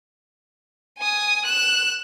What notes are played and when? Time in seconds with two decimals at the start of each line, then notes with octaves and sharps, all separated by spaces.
0.98 G#5 D#6
1.45 F#6 E7